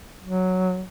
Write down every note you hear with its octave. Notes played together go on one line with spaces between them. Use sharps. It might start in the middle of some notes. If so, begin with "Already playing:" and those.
F#3